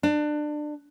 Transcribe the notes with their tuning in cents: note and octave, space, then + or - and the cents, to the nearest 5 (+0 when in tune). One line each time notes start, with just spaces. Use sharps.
D4 +25